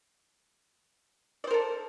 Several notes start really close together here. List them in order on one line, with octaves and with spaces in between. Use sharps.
D5 C5 A#4 A4